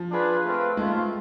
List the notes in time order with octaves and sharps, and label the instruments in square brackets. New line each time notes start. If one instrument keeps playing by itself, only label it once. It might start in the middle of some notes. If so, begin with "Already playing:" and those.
Already playing: [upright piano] F3
[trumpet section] D4 F4 G#4 B4
A3 C4 F4 B4
[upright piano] G#3 [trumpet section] A3 C4 F4